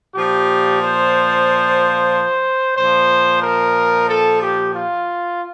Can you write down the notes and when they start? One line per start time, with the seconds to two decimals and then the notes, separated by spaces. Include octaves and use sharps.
0.14 A#2 F3 G4
0.80 C5
2.76 A#2 F3 C5
3.42 A#4
4.08 A4
4.40 G4
4.73 F4